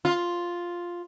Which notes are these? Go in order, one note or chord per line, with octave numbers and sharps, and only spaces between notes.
F4